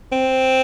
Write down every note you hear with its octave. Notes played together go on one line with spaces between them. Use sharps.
C4